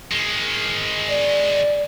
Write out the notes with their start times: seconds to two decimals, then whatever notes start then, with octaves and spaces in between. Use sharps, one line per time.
0.11 D#3 G#3
1.09 D5